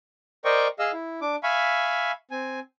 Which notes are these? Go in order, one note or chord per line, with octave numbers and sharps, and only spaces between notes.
A#4 C5 D5 D#5 G5 C#6
G#4 D#5 F5 E6
E4
D4 D6
E5 F5 G#5 B5 C#6
C4 G#5